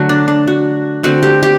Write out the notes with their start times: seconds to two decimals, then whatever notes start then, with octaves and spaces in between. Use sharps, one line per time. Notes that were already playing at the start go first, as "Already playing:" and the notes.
Already playing: D3 F#3 A3 F#4
0.09 D4
0.28 D4
0.47 F#4
1.03 D3 A3 C4 F#4
1.23 G4
1.43 G4